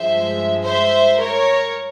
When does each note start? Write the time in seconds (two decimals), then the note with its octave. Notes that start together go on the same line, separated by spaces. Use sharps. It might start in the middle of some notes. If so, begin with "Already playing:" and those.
Already playing: G2 F3 G#3 C5 E5
0.65 C5 E5
1.20 A#4 C#5